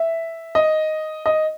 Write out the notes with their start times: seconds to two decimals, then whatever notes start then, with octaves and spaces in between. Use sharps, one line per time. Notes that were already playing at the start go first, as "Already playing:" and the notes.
Already playing: E5
0.55 D#5
1.26 D#5